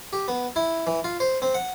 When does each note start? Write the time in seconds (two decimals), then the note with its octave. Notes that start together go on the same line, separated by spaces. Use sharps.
0.13 G4
0.28 B3
0.56 E4
0.87 E3
1.04 F4
1.20 C5
1.42 C4
1.54 F#5